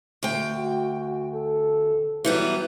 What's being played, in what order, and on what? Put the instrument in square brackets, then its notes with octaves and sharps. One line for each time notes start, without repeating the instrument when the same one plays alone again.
[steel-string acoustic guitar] D2 G5
[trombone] F#4
F#4
A4
[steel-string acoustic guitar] E3 G3 B3 [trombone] F#3